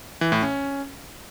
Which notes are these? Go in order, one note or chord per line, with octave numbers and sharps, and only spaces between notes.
E3
A2
C#4